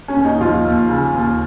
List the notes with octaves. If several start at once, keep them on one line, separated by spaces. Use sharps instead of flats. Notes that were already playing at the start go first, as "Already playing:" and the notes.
C#4
D#2
D#4
D#2 F3 F4
D#2
C#3
D#2